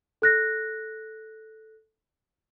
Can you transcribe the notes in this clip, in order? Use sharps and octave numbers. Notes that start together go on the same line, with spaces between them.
A4 F#6 A#6